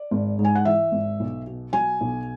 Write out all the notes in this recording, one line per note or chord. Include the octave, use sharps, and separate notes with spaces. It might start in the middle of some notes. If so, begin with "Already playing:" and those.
Already playing: D5
G#1
G#2
G#5
F#5
E3 E5
G#1
B1
B2
F#3 G#5
B1